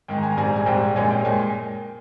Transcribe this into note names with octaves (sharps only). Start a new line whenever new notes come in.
G#2 D#3 G#3 G5
A#5
G#5
A#5
A#1 G#2 G3 C4 G#5
A#5
G#5
A#1 G#2 G3 C4 G5
A#1 A#2 G#3 C#4 G#5
G5
A#2 G#3 G#5